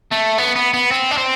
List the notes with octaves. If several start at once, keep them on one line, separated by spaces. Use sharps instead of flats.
A3
B3
B3
B3
C4
D4
C4